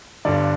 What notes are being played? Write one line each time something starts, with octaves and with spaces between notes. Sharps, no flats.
G1 G2 D3 D5